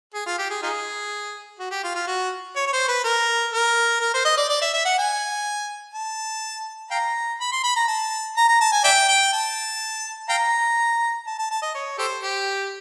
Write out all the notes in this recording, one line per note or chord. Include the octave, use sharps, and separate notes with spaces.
G#4
F4
G4
G#4
D#4 F4 G#4
F#4
G4
F4
F4
F#4
C#5
C#5
C5
B4
A#4
A#4
A#4
C5
D#5
D5
D5
E5
E5
F#5
G#5
A5
F5 G5 A#5
B5
C6
B5
A#5
A5
A#5
A#5
A5
G#5
D5 E5 G5
G5
A5
F5 G5 A#5
A5
A5
A5
D#5
C#5
G4 A4 C5
G4